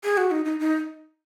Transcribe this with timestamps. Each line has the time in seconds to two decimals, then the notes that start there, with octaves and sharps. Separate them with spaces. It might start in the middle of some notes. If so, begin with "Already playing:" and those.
0.04 G#4
0.17 F#4
0.31 D#4
0.45 D#4
0.60 D#4